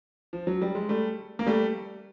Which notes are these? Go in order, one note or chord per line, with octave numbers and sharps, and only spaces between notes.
F3
F#3
G3
G#3
G3 A3
A#3
G3 A3